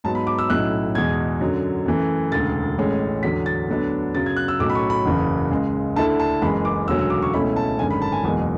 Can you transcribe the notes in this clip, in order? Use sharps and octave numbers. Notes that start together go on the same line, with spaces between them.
G#2 F#3 B3 A5
B5
D6
E6
B1 A2 F#3 C#4 E4 F#6
E2 B2 G#3 G#6
F#2 D3 F#3
F#2 E3 A3
E1 D2 C#3 A6
A1 A2 G#3 C#4
E2 D3 F#3 B6
A6
D2 D3 F#3 B3 D4
F#2 C#3 F#3 A6
G#6
F#6
E6
B1 A2 F#3 C#4 D6
B5
C#6
B5
F#1 E2 C#3
C#2 C#3 G#3
D2 D3 A3 E4 A5
A5
F#1 F#2 E3 G#3 B5
D6
E1 D2 C#3 F#3 C#4 E6
E6
D6
C#6
C#2 B2 A3 C#4 E4 B5
A5
G#1 F#2 D3 G#3 C#4 G#5
B5
A5
G#5
F#1 E2 B2 G#3 G#5